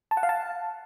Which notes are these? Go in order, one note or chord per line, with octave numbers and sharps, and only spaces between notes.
A5
F#5
F5
A5